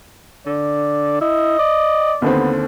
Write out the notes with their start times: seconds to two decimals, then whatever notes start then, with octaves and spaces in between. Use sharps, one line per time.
0.47 D3 D5
1.21 E4 D#5
1.59 D5
2.22 D#2 D3 B3 C4